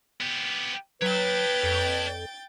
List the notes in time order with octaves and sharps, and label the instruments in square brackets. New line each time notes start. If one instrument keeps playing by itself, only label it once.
[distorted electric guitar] B3 G4
[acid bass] F#3 [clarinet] B4 [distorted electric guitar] C#5 A5 [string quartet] G5 G6 A6
[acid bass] F2